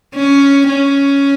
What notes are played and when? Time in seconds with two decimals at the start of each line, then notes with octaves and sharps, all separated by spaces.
0.15 C#4
0.69 C#4